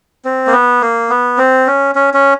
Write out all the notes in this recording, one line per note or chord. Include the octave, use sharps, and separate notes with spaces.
C4
A#3
B3
A#3
B3
C4
C#4
C#4
C#4